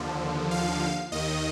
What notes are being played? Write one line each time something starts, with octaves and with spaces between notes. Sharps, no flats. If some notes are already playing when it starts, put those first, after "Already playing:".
Already playing: D#2 D3 F3
F5
D#2 D#3 D#5